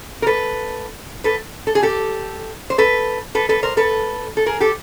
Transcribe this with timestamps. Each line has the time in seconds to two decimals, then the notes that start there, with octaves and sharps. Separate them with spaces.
0.22 A#4
0.26 A4 B4
1.24 A4 B4
1.67 A4
1.75 G#4
1.83 G4 A4
2.70 C5
2.78 A4 B4
3.35 A4 B4
3.49 A4 B4
3.63 A#4 C5
3.77 A4 B4
4.37 A4
4.46 G#4 A#4
4.60 G4 A4